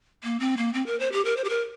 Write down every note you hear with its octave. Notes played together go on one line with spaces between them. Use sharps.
A#3
C4
A#3
C4
A#4
C5
G4
A#4
C5
G4
A#4